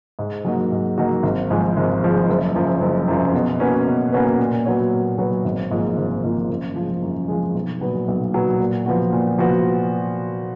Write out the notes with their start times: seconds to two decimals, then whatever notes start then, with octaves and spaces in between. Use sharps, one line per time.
0.19 G#2
0.45 F#3 A#3 D#4 F#4
0.72 G#2
0.98 F#3 A#3 D#4 F#4
1.23 G#1
1.50 G#2 F3 G#3
1.77 G#1
2.03 G#2 F3 G#3
2.29 F#1
2.55 F#2 F3
2.81 F#1
3.08 F#2 F3
3.34 B2
3.60 A#3 C#4 F#4 B4
3.87 B2
4.12 A#3 C#4 F#4 B4
4.39 A#2
4.65 F#3 B3 F#4 C#5
4.92 A#2
5.18 F#3 B3 F#4 C#5
5.45 G#1
5.71 G#2 F3 A#3 F4
5.97 G#1
6.23 G#2 F3 A#3 F4
6.49 F#2
6.76 F3 G#3
7.02 F#2
7.28 F3 G#3
7.55 B1
7.81 A#2 F#3 B3
8.08 B1
8.33 A#2 F#3 B3
8.60 A#2
8.86 F3 B3 F#4
9.12 A#2
9.38 F3 B3 F#4